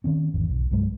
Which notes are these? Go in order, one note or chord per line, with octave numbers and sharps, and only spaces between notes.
D#3 C4 C#4
G#1 E2
B1
C2 G2 F#3 G#3